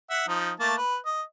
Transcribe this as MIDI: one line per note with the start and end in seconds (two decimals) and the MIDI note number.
0.10 0.26 76
0.10 0.26 78
0.28 0.52 53
0.28 0.52 63
0.60 0.75 57
0.60 0.75 58
0.60 0.75 81
0.78 0.97 71
1.06 1.22 75